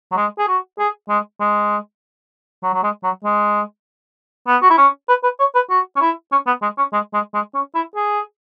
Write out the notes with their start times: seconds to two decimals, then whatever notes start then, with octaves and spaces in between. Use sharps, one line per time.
0.12 F#3
0.17 G#3
0.38 G#4
0.48 F#4
0.79 G#4
1.09 G#3
1.40 G#3
2.63 F#3
2.74 F#3
2.83 G#3
3.04 F#3
3.24 G#3
4.47 B3
4.62 F#4
4.70 E4
4.78 C#4
5.09 B4
5.23 B4
5.40 C#5
5.55 B4
5.70 F#4
5.96 C#4
6.01 E4
6.32 C#4
6.47 B3
6.62 G#3
6.78 C#4
6.93 G#3
7.14 G#3
7.34 G#3
7.54 C#4
7.75 E4
7.96 G#4